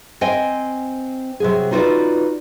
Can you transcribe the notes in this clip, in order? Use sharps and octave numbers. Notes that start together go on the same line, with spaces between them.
C4 C5 D#5 G5 G#5
C3 F#3 G#4
D#4 F4 F#4 G#4 B4 D5